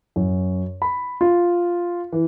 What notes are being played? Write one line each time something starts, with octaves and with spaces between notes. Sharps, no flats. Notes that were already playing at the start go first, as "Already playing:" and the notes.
F#2
B5
F4
E3